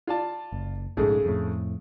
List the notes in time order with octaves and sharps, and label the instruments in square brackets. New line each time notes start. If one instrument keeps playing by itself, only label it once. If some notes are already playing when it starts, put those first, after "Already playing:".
[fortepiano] F4 D5 A5
[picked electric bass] F#1
[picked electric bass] A#1 G#2 [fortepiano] C#3 G#3 A3
[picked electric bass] F2 A2